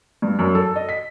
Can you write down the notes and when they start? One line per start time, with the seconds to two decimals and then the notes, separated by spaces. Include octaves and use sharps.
0.22 G2
0.39 F#2
0.55 A4
0.76 D#5
0.89 B6